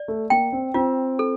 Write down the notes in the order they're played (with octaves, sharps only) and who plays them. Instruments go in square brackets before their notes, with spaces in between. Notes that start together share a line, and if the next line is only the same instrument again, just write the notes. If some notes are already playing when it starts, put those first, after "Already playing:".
Already playing: [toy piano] D5
[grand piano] A3
[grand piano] A#3 [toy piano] G5
[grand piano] C4
[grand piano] C4 [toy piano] F4
[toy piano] A4